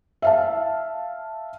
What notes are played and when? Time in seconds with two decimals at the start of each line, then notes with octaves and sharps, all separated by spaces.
0.22 E5 F5 A5